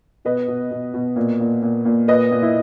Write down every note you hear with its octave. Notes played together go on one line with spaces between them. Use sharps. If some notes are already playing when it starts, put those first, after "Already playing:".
B2 B4 D#5
B2
B2
B2
A#2
A#2
A#2
A#2
A#2 B4 D#5
A#2
E4